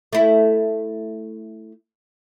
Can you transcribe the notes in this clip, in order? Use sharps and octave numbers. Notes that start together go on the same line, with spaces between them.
A3 E4